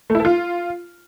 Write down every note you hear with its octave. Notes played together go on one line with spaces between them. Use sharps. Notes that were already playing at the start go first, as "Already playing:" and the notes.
A3
E4
A4
F4